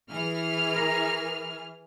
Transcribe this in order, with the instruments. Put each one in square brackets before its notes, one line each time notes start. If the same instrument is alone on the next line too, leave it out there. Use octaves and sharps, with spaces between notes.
[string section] E3 G#4 F6
[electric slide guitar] A#4